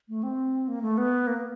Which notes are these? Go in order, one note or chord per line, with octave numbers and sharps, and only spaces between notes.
A3
C4
A#3
A3
B3
A#3